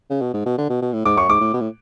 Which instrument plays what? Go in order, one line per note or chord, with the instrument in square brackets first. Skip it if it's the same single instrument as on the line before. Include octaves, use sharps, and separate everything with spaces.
[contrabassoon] C#3
B2
G#2
B2
D3
B2
B2
A2
[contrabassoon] G#2 [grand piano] D6
[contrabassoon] F#2 [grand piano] C#6
[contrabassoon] G#2 [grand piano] D6
[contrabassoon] A2
B2
A2